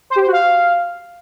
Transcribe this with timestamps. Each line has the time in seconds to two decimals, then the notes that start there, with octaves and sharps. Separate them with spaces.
0.10 C5
0.16 G4
0.21 C5
0.27 F#4
0.33 F5